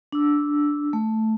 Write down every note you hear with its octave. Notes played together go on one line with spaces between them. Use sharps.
D4 E6
A3